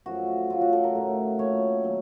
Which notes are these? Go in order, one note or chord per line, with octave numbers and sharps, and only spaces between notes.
F#2 F3 A3 F#4
C#3 F#3 A3 F4
F#4
A4
A#4
A2 A3
A#2 A3 C#5
D#3 F#3